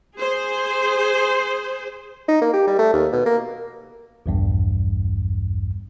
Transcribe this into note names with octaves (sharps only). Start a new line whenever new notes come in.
G#4 C5
D#4
A#3
G4
G3
A3
D#2
B2
A#3
A#1 E2 G2